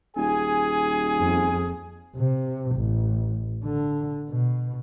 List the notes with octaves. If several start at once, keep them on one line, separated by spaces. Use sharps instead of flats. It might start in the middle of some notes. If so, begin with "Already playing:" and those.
D#1 G#4 G#5
F2
C3
A1
D3
B2